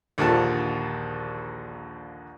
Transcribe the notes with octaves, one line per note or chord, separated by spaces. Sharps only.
A#1 D#2 D3 F3 A5